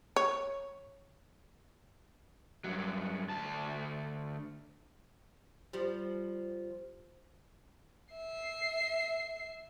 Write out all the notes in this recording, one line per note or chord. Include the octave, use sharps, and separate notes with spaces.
C#5
G2 F#3
D2 A5
F3 G3
E5 C7